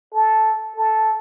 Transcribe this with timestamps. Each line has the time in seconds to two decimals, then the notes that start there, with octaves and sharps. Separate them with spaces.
0.14 A4
0.76 A4